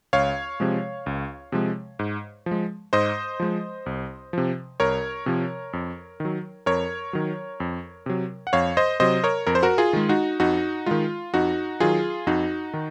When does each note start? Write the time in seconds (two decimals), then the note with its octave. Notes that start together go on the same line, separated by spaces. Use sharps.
0.13 C#2 C#5 F5
0.60 C3 F3 G#3
1.06 C#2
1.52 C3 F3 G#3
1.99 G#2
2.46 F3
2.51 G#3
2.93 G#2 C5 D#5
3.40 F3 G#3
3.86 C2
4.33 C3 F3
4.80 C2 A#4 C#5
5.26 C3 F3
5.73 F2
6.20 D#3 F#3
6.66 F2 A#4 C#5
7.13 D#3 F#3
7.60 F2
8.06 C3 F#3
8.47 F#5
8.53 F2 C#5 F5
8.77 C5 D#5
9.00 C3 F#3 C5 D#5
9.24 A#4 C#5
9.47 F2 A#4
9.55 C5
9.63 F#4 A#4
9.78 F4 G#4
9.93 D#3 G#3
10.09 D#4 F#4
10.40 F2 D#4 F#4
10.86 D#3 G#3 F4
11.34 F2 D#4 F#4
11.80 D#3 F#3 F4 G#4
12.27 F2 D#4 F#4
12.73 D#3